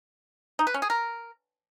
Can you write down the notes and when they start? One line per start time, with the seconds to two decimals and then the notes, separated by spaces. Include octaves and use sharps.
0.59 D#4
0.67 B4
0.74 C#4
0.82 G#4
0.90 A#4